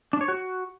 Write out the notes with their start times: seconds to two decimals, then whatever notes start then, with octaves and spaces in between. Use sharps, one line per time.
0.13 D4
0.21 C#5
0.28 F#4